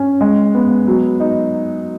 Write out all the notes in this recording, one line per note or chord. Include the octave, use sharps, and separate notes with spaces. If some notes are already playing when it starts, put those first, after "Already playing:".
Already playing: C#4
G#3
B3
F#3
D#4